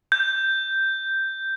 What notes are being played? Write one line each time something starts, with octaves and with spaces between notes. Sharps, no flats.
G6